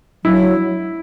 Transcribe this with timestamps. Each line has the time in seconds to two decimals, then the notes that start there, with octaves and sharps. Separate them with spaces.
0.24 F#3 E4